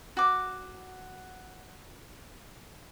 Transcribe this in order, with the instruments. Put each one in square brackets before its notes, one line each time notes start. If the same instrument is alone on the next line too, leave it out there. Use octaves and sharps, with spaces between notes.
[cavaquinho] F#4 D6